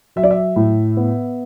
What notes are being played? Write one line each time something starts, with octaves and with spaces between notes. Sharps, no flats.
F#3 E5
D5
E5
A2
B3